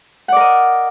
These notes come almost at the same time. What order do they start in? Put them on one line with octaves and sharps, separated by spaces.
F#5 D5 A#4 D#5